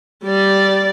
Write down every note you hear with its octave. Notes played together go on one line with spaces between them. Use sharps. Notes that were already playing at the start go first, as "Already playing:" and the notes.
G3 D5